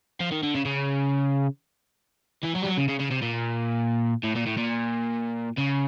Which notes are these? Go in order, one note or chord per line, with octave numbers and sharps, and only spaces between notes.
F3
D#3
D3
C#3
C#3
E3
F#3
G3
F#3
C#3
C#3
C#3
C3
A#2
A2
A#2
A2
A#2
C#3